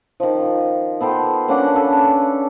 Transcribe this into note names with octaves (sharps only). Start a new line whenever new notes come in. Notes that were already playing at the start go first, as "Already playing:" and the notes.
D#3 F3
B3 A4 C5 G5
A#3 C#4 D4 F#5
A4 B4